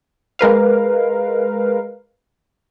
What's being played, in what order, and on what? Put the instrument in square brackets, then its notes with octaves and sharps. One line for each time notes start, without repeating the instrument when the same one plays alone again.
[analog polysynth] G#3 A#4 B4 F5